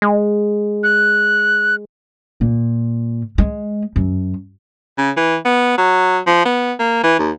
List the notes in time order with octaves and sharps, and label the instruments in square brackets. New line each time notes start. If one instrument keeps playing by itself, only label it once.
[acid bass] G#3
[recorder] F#6
[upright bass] A#2
G#3
F#2
[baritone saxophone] C#3
E3
B3
F#3
F3
B3
A#3
E3
D#2